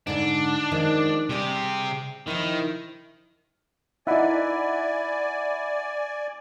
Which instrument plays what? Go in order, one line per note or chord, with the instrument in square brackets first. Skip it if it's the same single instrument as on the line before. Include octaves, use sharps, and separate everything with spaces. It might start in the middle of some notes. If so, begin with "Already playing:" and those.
[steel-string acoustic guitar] G#2 D3 [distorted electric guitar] D4
[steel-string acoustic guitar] D#3 F3 G#3
[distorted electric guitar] C3 G4 [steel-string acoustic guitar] G3 G#4
[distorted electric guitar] D#3 [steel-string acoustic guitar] F3 E4
[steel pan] D#4 E4 [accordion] D5 G#5 [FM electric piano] E5 F#5 B5